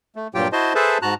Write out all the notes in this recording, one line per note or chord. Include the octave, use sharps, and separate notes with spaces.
A3
G2 A#2 F#3 F4 G4 G5
E4 F#4 C5 D#5 A5 C6
G#4 A4 B4 C5 E5 A5
G#2 F#4 A5 A#5 F#6